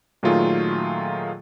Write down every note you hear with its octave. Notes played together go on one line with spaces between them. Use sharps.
A#2 D#3 F#3 A3 F4 G#4